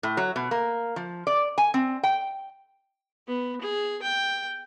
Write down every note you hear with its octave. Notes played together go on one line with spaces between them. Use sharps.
A2
F#3
B2
A#3
F3
D5
G#5
C4
G5
B3
G#4
G5